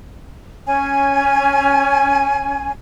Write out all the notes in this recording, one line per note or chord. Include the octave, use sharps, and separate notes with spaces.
C#4 G#5